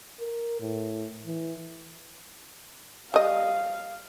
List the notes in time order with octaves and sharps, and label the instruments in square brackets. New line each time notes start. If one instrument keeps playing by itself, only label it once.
[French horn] A#4
A2
E3
[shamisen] G3 D#5 [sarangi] F5